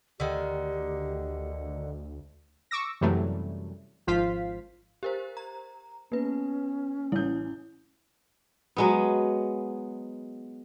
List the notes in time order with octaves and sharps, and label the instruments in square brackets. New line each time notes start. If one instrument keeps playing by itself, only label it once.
[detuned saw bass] D2 [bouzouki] D3 D#3 [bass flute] G4
[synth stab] C#6 D6 E6 A#6
F#2 C3 E3 F#3 G3 A3
G#1 F3 F4 C5 F5 B6
[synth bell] G4 A#4 C5
A#5
[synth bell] A#3 B4 [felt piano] B3 [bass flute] C#4
[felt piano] A1 G6 [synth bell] E4
[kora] F#3 G#3 B3